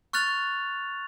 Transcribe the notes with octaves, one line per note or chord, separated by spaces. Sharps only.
C#6 F6 F#6 A6 F7